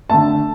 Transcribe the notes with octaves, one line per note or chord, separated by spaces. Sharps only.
D3 A3 A5